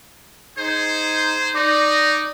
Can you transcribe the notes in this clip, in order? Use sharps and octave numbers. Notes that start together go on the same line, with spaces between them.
D#4 G#4 C5
D#4 D5